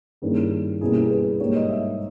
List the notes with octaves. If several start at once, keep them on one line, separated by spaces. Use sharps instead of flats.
G2 D#3 A#3 C#4 E4 G#4
B2 G3 A#3 C#4 E4 G#4
G#4
B4
G#2 G3 A#3 C#5
D#5
E5